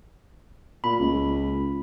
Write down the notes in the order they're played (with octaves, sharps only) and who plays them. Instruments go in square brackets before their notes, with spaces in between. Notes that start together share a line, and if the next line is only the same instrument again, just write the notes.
[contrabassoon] A#2 [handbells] B5
[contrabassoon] C#2